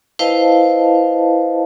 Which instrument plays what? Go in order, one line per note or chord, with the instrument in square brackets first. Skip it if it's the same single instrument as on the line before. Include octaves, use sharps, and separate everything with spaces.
[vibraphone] E4 B4 C5 D#5 F5 A5